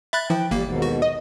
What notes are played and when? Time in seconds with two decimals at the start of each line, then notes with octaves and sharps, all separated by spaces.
0.13 E5 B5 F#6 A6
0.30 E3 F3 G5
0.51 G1 G3 A#3
0.65 D#2 G#2 B2
0.82 F#4
1.02 D#5